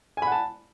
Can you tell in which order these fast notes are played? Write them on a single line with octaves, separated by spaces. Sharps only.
G#5 B5 F#5 A5